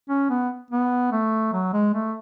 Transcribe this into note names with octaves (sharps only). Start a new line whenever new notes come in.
C#4
B3
B3
A3
F#3
G#3
A3